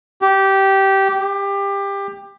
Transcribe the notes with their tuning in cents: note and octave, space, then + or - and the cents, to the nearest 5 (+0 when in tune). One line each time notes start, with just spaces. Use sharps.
G4 -15
G4 +20